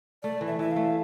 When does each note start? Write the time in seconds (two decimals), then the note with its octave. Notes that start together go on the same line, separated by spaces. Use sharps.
0.23 A3 D5
0.41 E3
0.47 E5
0.59 E3 E5
0.71 A3 F5